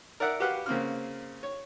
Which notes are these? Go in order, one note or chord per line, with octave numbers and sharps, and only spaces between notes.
A#4 D5 E5 F#5
F#4 G4 B4 F5 F#5
C#3 A#3 C4 F6
C#5